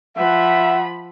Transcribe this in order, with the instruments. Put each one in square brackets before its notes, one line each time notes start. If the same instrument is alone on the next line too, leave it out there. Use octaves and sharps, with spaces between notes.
[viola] F3 B5 [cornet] E5 [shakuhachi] F#5